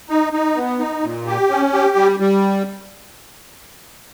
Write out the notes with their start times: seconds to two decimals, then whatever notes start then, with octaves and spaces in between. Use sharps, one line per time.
0.09 D#4
0.33 D#4
0.56 B3
0.79 D#4
1.03 A#2
1.27 G4
1.50 C#4
1.73 G4
1.96 G3
2.20 G3